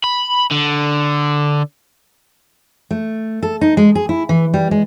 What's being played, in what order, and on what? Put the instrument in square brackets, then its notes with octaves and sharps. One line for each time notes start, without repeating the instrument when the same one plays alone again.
[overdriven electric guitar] B5
D3
[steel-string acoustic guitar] A3
A4
D#4
G#3
G#4
E4
E3
G3
G#3